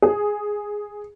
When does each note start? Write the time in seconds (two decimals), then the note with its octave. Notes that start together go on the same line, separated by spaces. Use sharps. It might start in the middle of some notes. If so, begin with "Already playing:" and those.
0.02 G#4